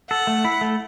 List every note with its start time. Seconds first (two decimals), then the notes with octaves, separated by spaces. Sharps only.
0.10 A4 F#5
0.27 A3
0.45 E4
0.61 A3